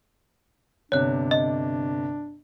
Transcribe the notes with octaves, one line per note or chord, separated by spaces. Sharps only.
G1 C3 D4 C#5 F#6
D#5